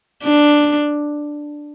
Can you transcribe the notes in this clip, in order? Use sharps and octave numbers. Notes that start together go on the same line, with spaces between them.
D4